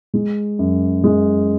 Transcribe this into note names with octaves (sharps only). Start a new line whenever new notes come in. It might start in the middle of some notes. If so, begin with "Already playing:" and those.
G#3
F#2
G#3